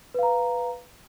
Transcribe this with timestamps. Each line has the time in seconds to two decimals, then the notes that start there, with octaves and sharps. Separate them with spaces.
0.14 B4
0.19 F5
0.23 A#5